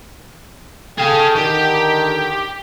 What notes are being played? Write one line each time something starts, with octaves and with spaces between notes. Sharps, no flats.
G#4 A4 F5 G5
D3 D#3 G4